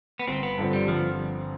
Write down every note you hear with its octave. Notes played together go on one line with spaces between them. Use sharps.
B3
G1 C4
B3
G2 D3 F3 C4
G3
G1 F3